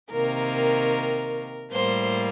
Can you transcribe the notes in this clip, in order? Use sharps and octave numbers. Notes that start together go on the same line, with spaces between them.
C3 D#3 A#3 A#4
A2 G3 A#3 C5